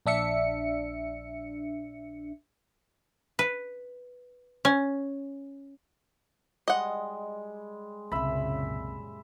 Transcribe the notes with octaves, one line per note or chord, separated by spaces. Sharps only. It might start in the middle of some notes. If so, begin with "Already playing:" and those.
A#1 D4 E5 C#7
B4
C#4
G3 G#3 D#5 F#5
C2 F#2 A#2 C#3 C4 E5 B5